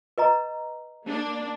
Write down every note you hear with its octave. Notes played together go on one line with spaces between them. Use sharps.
B4 D#5 A#5
A#3 D4